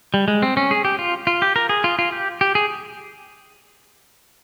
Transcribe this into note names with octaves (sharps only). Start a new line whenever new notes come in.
G3
G#3
C4
C#4
G#4
G4
F4
F4
G4
A#4
G#4
F4
F4
G4
G4
G#4